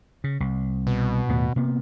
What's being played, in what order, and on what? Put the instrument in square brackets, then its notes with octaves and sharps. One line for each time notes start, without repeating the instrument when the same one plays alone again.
[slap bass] C#3
C2
[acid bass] B2
[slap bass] D#2 A2 B3
C3 A#3 B3